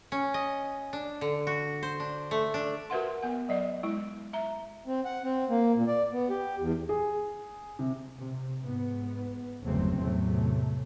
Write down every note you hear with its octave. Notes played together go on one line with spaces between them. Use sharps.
C#4
D#5
D4
D3
F#4
C5
D4
A3
D4
F#4 A#4 B4 E5 F#5 C6
B3 F#5
F#3 D5 D#5
G#3 E4
E5 A#5
C4
F#5
C4
A#3
A#2
D5
B3
G4
E2
G#4
C3
C3
G#2 B3
G1 E2 C#3 F#3 A3 C4
E2 A2 C3 F#3 A3